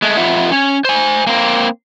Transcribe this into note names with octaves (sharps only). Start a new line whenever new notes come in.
G#3 A3
F2 F4 E5 F#5
C#4
C5 G#5
A#3 C4